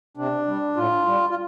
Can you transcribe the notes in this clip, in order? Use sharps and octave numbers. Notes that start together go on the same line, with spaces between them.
C3 D4
G3
A2 F4
G3
F4